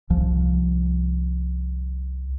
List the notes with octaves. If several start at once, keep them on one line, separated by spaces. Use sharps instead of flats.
C2 F3